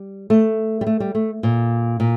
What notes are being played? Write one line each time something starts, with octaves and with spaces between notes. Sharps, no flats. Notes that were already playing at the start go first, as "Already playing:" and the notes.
Already playing: G3
A3
G3
A3
G3
A3
A#2
A#2